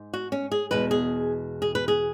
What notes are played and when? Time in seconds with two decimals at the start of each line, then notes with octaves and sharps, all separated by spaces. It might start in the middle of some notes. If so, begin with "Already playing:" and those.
Already playing: G#2
0.14 F#4
0.32 C#4
0.52 G#4
0.71 E2 B2 G#3 B3 B4
0.91 G#4
1.62 G#4
1.75 B4
1.88 G#4